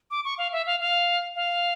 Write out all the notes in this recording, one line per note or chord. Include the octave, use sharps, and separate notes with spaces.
D6
C#6
F5
E5
F5
F5
F5